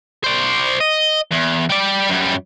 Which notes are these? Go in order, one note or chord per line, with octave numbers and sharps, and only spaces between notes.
C5 D5
D#5
E2
G3 D5
F#2 G3